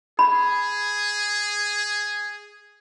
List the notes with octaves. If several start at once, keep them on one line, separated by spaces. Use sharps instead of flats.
G#4 B5